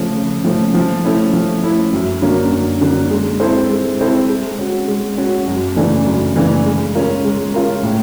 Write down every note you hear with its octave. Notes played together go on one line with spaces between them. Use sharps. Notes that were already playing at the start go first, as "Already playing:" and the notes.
Already playing: C#3 F3 A3 C#4
C#3
F3 A3 C#4
F3
A3 C#4 E4
F3
A3 C#4 E4
F#2
D3 F#3 A#3 C#4
F#2
D3 F#3 A#3 C#4
G#3
C4 E4 A4 C5
G#3
C4 E4 A4 C5
G#3
C#4 F#4
G#3
C#4 F#4
F#2
C#3 E3 A3 D4
F#2
C#3 E3 A3 D4
G#3
C#4 F4 A#4
G#3
C#4 F4 A#4
A2